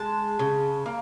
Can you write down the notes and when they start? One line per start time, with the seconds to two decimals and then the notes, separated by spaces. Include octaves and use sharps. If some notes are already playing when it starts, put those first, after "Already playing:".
Already playing: G#3 A5
0.39 C#3
0.86 A#3